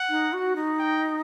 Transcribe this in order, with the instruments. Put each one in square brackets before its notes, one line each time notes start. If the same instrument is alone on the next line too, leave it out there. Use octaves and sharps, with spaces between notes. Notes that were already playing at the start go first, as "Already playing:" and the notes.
Already playing: [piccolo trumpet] F#5
[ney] D#4
F#4
D#4
[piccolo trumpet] G5